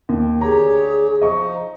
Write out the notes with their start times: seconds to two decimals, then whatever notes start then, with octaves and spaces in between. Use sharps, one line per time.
0.09 D#2 G5
0.41 D2 G4 G#4 C#5 A#5
1.22 F3 D#4 D#5 C#6